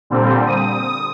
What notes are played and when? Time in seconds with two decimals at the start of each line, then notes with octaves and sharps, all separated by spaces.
0.10 A#2 D3 G3 C4
0.47 D#6